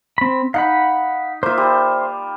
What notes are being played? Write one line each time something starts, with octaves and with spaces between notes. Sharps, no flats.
C4 B5
D#4 F5 F#5 B5
A#3 F4 C5 E5
G3